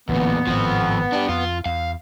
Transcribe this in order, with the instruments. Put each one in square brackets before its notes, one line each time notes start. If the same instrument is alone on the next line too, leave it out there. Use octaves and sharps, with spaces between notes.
[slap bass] A1 D3 [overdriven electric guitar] E2 A#2 [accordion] B3
[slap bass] G#1 A2 [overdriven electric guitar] F3 C4
[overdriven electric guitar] D4 G4
[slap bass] F2 [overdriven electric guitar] F4
[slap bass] E2 [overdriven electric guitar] F5